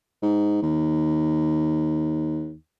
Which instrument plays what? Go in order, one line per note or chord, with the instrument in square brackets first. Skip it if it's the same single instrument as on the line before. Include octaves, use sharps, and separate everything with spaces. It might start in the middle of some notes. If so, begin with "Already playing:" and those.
[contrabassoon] G#2
D#2